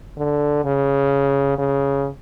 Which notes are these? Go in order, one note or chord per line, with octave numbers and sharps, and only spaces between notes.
D3
C#3
C#3